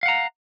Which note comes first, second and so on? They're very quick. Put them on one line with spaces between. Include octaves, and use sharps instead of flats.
F5 F#5 A#5